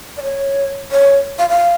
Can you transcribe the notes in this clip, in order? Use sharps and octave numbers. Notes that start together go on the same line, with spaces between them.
D5
C#5
C#5
F5
F5